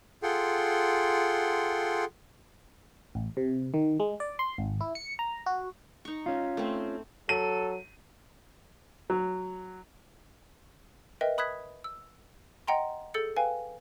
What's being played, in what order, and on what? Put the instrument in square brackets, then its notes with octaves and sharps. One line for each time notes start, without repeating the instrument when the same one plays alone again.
[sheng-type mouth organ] F4 G#4 A4 F#5 G5 C6
[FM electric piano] A1
C3
D#3
G#3
D5
C6
G#1
E4
C#7
A#5
F#4
[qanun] D#4 C#6
[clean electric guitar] C#4 F4
[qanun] A3 C4
[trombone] F#3 [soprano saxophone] A4 [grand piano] D#7
[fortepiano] F#3
[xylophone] A#4 B4 D#5 E5 G5
B5 D#6 F#6 G#6 B6
E6
D#5 F#5 G5 A#5 C6
G#4 A4 E6 G6 A6 C#7
B4 F5 G5 G#5